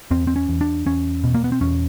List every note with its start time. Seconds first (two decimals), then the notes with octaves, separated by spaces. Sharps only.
0.11 E2 C4
0.27 C4
0.36 C#4
0.49 E2
0.61 D4
0.86 E2 C#4
1.24 B2
1.34 A#3
1.44 B3
1.52 C4
1.61 E2 C#4